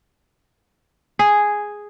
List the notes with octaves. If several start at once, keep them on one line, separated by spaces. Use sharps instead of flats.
G#4